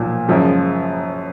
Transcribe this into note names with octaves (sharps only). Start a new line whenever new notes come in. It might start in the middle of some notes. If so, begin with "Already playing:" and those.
Already playing: B1 A#2 F3
F#1 F#2 F3 G#3